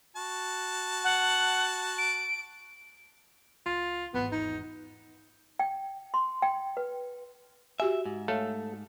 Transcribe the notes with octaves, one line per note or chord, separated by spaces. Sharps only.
F#4 A5
F#5
D7
C#2 F4
G#1 E2 B3
D#4
G5
C6
G5
B4
F#4 G4 E5 G#5
G#2
A3 A4 C#5 F5